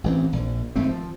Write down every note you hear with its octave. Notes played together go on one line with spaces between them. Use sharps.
A1 E3 C4
A#1
G#1 F#2 A3 C4
F3